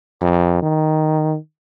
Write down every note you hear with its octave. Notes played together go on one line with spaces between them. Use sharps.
F2
D#3